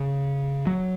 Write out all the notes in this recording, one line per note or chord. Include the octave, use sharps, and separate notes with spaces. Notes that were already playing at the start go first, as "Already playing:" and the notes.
Already playing: C#3
F#3